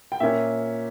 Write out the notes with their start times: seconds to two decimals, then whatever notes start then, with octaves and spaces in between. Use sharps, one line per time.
0.12 G5
0.20 A#2 A#3 C#4 E5